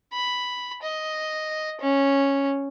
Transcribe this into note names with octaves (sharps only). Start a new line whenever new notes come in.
B5
D#5
C#4